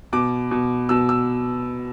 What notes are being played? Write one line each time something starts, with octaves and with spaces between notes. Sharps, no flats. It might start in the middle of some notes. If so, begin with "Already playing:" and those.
B2 D6
B2
B2 E6
E6